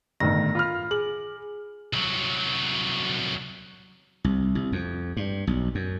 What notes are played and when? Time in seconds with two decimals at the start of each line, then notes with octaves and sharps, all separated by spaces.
0.20 G1 A2 D#3 A#6
0.55 F4 B5 F6
0.91 G#4 F#7
1.93 C2 F#3
4.24 C2
4.55 C2
4.72 F2
5.17 G2
5.47 B1
5.75 F#2